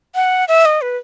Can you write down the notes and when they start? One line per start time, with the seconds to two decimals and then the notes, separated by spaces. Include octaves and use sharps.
0.15 F#5
0.48 E5
0.65 D#5
0.82 B4